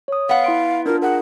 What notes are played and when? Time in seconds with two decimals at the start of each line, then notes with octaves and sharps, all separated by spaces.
0.08 C#5 D#6
0.29 B3 F5 F#5
0.44 E4 C6 D7
0.86 D4 F4 A#4
1.02 G#4 A#4 F#5